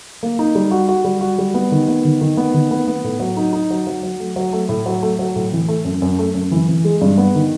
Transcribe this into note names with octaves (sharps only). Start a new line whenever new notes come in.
A#3
D#4
G3
F#4
F#4
G3
F#4
G3
B3
D#3
B3
D#3
D#3
B3
D#3
B3
B3
A2
F#3
D#4
D#4
F#3
F#3
F#3
A3
F#3
A3
A2
F#3
A3
F#3
A2
E3
A3
F#2
F#2
A3
F#2
E3
E3
G#3
G2
B3
D#3